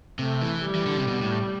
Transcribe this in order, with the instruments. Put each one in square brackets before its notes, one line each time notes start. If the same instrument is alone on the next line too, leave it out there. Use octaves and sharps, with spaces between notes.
[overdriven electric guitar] C3 [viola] A3
[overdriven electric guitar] E3
[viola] G3
[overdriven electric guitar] E3
D3
C3
B2
A2